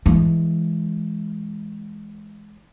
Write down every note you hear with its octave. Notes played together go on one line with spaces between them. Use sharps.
E3 G#3